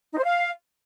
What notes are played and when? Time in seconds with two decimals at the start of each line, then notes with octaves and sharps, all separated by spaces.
0.13 D#4
0.18 C5
0.24 F5